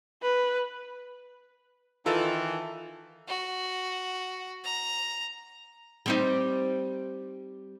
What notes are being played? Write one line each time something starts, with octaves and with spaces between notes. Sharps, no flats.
B4
D#3 E3 F4 A4
F#4
A#5
G3 C4 D#4